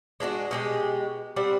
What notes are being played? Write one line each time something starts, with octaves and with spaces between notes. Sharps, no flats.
G#3 D4 F4 F#4
B2 G#3 G4
G3 C4 F#5